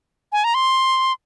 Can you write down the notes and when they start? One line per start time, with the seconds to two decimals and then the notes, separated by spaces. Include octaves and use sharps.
0.32 G#5
0.44 A#5
0.54 C6